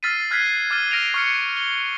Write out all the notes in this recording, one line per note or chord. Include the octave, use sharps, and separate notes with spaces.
E6 F6 A6 B6 C7 D#7
F6 F#6 G#6 A6 B6 C7
D6 F6 A6 D#7 G7
F6 A#6 D7 D#7 F7
C#6 F6 C#7
G7